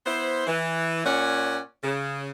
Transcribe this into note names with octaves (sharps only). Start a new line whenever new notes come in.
B3 E4 C5
E3
A#2 C#4 C#5 D5 F#5
C#3